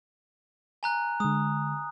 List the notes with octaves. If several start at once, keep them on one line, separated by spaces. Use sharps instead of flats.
G#5 A#5 F#6
D3 G#3 D#6